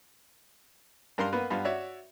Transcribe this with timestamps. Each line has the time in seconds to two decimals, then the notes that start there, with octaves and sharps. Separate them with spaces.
1.18 G2 A#4 F5 C6
1.33 A#3 B3 B4
1.50 G2 B3 F4 F5
1.65 F#4 C#5 D5 E5